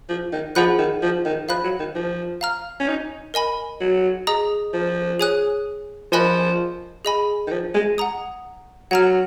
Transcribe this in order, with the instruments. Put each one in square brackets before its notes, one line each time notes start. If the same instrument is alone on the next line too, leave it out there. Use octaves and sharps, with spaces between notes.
[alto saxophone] F3
D#3
[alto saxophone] F3 [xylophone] G#4 D#5 F#5 B5 F#6
[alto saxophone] D#3
F3
D#3
[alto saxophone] F3 [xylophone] F5 B5 F#6
[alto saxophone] F#3
D#3
F3
[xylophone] F5 A#5 F6
[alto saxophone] C#4
D#4
[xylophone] A#4 D#5 G#5 B5
[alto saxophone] F#3
[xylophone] G#4 D#5 A#5 D#6
[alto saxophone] F3
[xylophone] G#4 C#5 G#5 D#6 F#6
[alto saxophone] F3 [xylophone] A#4 D#5 G#5 B5 F#6
[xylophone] G#4 D#5 G#5 B5
[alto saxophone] D#3
F3
G#3
[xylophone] F#5 A#5 D#6
[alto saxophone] F#3 [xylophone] F#5 A#5 F6